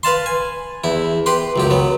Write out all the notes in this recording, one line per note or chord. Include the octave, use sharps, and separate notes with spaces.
B4 F5 A5 C6
G#5
E2 E4
G4 B4 C6
C#2 F#2 G4
F#3 B3